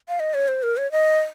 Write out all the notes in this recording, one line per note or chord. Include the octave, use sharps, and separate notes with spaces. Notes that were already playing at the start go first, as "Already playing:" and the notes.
F5
D#5
C#5
C5
A#4
C#5
D#5